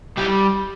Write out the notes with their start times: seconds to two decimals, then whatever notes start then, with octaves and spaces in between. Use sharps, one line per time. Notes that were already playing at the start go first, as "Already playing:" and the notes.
0.17 G3 E4 G4